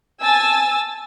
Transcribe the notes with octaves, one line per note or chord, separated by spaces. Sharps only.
G#5 A5 E6 A6